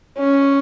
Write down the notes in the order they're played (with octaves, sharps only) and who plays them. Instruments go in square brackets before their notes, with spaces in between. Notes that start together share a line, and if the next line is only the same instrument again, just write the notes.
[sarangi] C#4